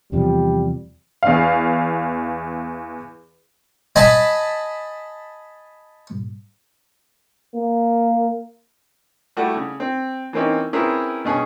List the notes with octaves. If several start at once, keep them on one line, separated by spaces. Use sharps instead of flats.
E2 C3 F3 G3
E2 F5
D#5 G#5 A5 B5
A#3
G3 A3 E4 F#4
C#3
C4
E3 A#3 C4 C#4 D#4
C4 C#4 E4 G#4 A#4 B4
G2 B2 C#4 G#4 G#5